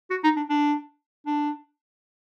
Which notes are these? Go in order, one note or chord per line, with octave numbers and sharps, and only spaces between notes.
F#4
D#4
D4
D4
D4